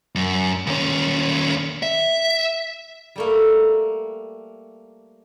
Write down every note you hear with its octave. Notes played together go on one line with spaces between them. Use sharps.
F#2
D#2 C#4
E5
G3 A3 A#3